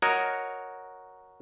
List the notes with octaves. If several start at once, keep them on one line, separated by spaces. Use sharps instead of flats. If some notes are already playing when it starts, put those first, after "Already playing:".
F#4 A#4 C#5 D#5 A#5